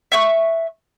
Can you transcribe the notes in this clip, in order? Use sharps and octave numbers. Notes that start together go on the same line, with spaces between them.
E5 C#6 F#6